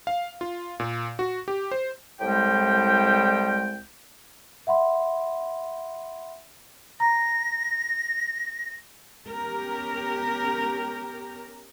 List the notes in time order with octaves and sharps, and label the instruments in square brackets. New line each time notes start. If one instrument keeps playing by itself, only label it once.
[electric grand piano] F5
F4
A#2
F#4
G4
C5
[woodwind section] C2 A2 G3 G#3 G5
[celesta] E5 F#5 B5 C6
[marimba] A#5 [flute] A#6
[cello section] B3 C#4 G4 A#4